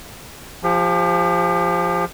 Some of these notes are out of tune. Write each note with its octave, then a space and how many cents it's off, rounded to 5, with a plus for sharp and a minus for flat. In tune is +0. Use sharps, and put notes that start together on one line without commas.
F3 +0 G4 +40